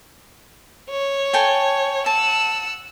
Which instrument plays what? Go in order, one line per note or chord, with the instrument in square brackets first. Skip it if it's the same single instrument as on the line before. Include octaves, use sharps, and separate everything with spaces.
[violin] C#5
[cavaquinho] A4 G5 G#5
[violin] F#5 E6 [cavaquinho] A5